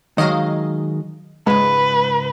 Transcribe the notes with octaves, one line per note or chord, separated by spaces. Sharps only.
D#3 F#3 G#3 D#5 F5
C#2 G#2 G#3 B4